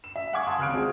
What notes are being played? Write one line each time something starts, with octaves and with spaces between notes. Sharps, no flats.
E7
E5
F5 F#5 G#5 C#6 D6 G#6
F5 F#5 G#5 A5 C6 D#6
G#1 C#2 F6 F#6 D7
G#3 C4 F4 F#4 G#4